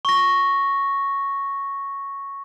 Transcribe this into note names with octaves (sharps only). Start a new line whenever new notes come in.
C#6 A#6